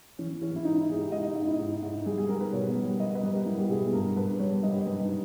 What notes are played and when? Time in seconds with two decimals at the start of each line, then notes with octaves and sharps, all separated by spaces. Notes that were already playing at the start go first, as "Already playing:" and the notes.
0.19 E3 C#4
0.41 E3 C#4
0.56 E4
0.65 G#2 D#4
0.81 E4
0.89 G#2 G#4
0.96 G4
1.12 G#3 D#5
1.24 D#5
1.35 G#2 D#5
1.42 D#4
1.47 E4
1.59 G#2
1.82 G#2
2.06 G3 G#4
2.18 G#4
2.29 G3 A#4
2.40 B4
2.52 B2 C#5
2.76 G3
2.99 G3 D#5
3.15 B4
3.23 G3
3.31 A#4
3.46 G3 E4
3.58 G4
3.69 B2 G#4
3.82 G#4
3.93 G2 A#4
4.16 G2 B4
4.39 G3 C#5
4.63 G3 D#5
4.86 G3 B4
5.02 D#4